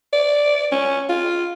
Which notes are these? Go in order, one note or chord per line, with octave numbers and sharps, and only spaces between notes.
D5
C#4
F4